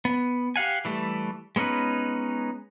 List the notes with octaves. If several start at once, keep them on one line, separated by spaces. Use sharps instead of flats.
B3
G4 F5 F#5 G#5
E3 G3 A3
G#3 B3 C#4 D#4 B4